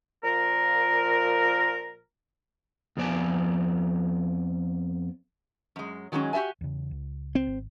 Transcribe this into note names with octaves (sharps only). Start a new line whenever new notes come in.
A#2 F3 A#4
F2 F3 B3 D5 G#5 A5
F#2 G#3
D#3 F#3 G#3 B3 C#4
F#4 G4 D#5 E5 G#5
E2 C#3
C#2
C4
G#1